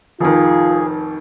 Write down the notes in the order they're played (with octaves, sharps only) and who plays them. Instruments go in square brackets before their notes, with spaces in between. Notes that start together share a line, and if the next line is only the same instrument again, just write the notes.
[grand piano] F1 D#3 [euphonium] F4 [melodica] G#4